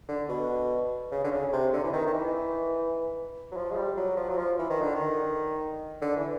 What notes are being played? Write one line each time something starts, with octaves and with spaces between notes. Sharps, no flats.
D3
B2
C#3
D3
C#3
C3
D3
E3
D#3
D#3
E3
F#3
F3
G#3
G3
F#3
F3
F#3
F3
E3
D#3
D3
D#3
D3
E3